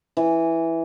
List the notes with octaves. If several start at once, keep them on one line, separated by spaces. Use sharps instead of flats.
E3